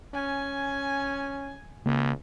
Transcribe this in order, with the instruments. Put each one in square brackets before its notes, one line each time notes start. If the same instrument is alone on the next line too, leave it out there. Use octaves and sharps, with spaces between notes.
[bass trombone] C#4 [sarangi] G#5
[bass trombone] C#2 [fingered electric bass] C#3 A#3